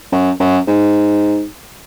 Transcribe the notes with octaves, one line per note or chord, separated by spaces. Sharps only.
F#2
F#2
G#2